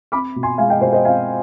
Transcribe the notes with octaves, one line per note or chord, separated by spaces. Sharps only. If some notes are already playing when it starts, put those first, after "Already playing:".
C4 B5 D6
B2
G#5 C6
G#3 F5 G#5
D#5 G5
B2 C5
C5 D#5
C4 F5 G#5